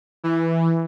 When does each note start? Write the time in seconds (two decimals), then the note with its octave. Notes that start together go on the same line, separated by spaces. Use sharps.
0.24 E3